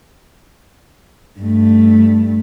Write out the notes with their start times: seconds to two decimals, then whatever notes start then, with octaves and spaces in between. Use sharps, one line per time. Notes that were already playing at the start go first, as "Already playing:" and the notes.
1.40 G2 A3